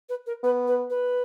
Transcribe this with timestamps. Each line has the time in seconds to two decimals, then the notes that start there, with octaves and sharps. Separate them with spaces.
0.09 B4
0.26 A#4
0.43 B3 B4
0.67 B4
0.90 B4